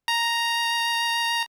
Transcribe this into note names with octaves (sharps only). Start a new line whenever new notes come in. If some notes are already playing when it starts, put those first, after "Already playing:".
A#5